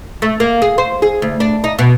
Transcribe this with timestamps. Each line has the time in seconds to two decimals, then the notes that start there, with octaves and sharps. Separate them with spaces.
0.22 A3
0.40 A#3
0.62 G#4
0.78 C5
1.02 G#4
1.22 D2
1.40 D4
1.64 D#4
1.79 B2